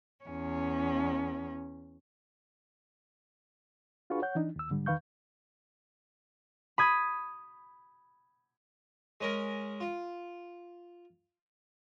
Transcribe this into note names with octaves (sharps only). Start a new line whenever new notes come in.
E2 C#4
D4 F4 F#4 G#4 B4 C#6
C#5 F#5 G6
E3 D4 D#4
D#2 E6
G#2 D3 G3
E2 D#3 B4 F5 C#6 G6
B5 D#6 G#6
G#3 C#4 A#4
F4